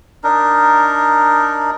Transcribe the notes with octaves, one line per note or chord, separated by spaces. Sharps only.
D4 D#4 A#4